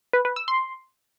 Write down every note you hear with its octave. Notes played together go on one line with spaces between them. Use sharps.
B4
B4
E6
C6